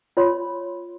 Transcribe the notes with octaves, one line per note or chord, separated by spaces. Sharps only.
F4 C#5 B5 C6